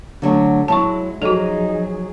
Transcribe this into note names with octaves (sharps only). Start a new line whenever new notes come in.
D3 F#3 A3
F#3 G#3 E4 A5 C#6
F3 F#3 D#4 F#4 G#4 A4